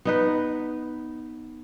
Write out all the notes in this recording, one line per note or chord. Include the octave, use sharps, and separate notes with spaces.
B3 D#4 B4